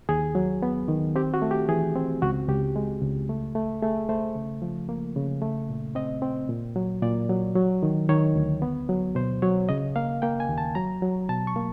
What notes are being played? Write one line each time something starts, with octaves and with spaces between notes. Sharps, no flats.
D#2 G#4
F#3
B3
D#3
C4 G4
F#4
A3
G4
E3 G#4
C4
C#2 F#4
C#2 G4
G#3
C#2
A3
A3
A3 G#4
A3 C5
C#3
F3
A#3
C#3
A3
A#2
C4 D#5
C4
A#2
F#3
A#2 D5
F#3
F#3
D#3
D#3 C#5
D2
B3
F#3
B2 C5
F#3 C#5
C#3 D#5
A#3 F5
A#3 G5
G#5
D#2
A5
F#3 A#5
F#3
B2 A5
C#6
A#3